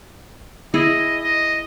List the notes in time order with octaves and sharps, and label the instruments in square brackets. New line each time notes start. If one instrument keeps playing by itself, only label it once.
[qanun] E4 G#4 [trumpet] D#5
[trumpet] D#5